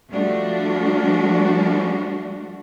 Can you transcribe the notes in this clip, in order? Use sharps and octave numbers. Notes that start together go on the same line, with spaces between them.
F3 G3 A3 D4 F#4